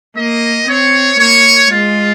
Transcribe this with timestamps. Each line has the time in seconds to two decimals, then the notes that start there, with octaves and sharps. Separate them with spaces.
0.17 A#3 D#5
0.68 C4 C#5
1.19 A#3 C#5
1.71 G#3 F4